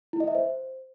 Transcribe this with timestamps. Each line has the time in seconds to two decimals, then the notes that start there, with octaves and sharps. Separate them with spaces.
0.13 E4
0.20 D#5
0.28 E5
0.35 C5